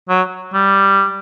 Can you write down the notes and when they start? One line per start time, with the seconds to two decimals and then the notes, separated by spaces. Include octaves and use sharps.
0.09 F#3
0.53 G3